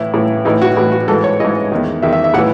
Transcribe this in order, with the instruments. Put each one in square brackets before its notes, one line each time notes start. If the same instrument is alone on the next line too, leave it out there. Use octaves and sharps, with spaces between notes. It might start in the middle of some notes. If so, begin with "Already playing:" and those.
Already playing: [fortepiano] A2 E3 E4
A2 E3
A2 E3 D#4
F#4
A2 E3
F#4
G#2 E3 A4
C#5
G#2 E3 D#5
E2 D#3
E2 D#3 E5
E5
E5
A2 F#5
E3